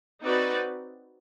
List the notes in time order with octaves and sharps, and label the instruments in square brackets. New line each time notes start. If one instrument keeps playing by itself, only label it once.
[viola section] C4 D#4 F#4 B4 D5